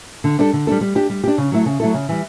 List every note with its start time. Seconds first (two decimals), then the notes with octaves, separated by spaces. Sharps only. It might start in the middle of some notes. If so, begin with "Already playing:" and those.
0.24 D3
0.39 G3 D4 A4
0.53 D3
0.67 G3 D4 A4
0.81 G3
0.95 D4 G4
1.10 G3
1.24 D4 G4
1.38 C#3
1.52 F#3 A3 E4 A4
1.66 C#3
1.80 F#3 A3 E4 A4
1.94 C#3
2.09 E3 G3